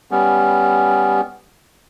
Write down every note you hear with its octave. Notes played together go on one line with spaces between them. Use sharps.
G3 B3 C#4